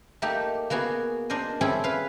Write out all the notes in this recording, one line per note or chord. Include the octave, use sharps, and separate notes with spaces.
A3 A#3 D#4 G4
A#3 B3 F#4 G#4
D4 A#4 C5 D#5
C4 C#4 E4 G#4 A4
B4 F5